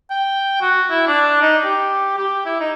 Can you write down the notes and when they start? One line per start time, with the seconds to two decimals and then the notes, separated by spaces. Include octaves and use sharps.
0.10 G5
0.61 F#4
0.90 E4
1.07 D4
1.42 D#4
1.64 G4
2.17 G4
2.45 E4
2.60 D#4